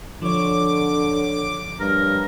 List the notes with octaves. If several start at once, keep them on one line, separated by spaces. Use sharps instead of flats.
D3 F3 C#5 D6
G2 A#4